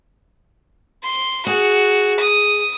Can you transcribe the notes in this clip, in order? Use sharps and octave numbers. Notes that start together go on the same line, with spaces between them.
C6
F#4 G#4
D#6